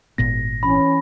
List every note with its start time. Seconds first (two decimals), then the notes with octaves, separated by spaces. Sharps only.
0.18 G#1 A#2 B3 A#6
0.63 E3 C#4 B5